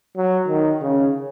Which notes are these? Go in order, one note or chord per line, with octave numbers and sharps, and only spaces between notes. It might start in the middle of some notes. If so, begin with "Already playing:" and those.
F#3
D#3
C#3